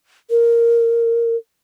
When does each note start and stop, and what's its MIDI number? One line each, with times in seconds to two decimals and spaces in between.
0.30 1.36 70